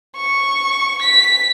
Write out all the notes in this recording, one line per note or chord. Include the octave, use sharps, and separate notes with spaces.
C#6
B6